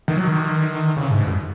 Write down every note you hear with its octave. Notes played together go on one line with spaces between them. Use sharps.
D#3
F#3
D#3
C#3
G#2
F#2